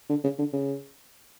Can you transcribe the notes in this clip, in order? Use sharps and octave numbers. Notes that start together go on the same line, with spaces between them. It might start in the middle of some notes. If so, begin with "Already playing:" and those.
D3
C#3
D3
C#3